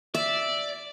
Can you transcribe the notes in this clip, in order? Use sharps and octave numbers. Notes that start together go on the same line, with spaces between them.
D5 E5